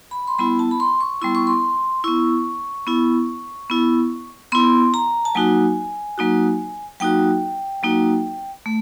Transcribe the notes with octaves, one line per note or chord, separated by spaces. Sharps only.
B5
C6
G3 B3 E4 B5
A5
B5
C6
C#6
G3 B3 E4 C6
C#6
C6
B3 E4 C#6
B3 E4
B3 E4
B3 E4 C6
A#5
A5
F#3 A#3 D#4 F#4 G#5
F#3 A#3 D#4 F#4
F#3 A#3 D#4 F#4 G5
F#3 A#3 D#4 F#4
A3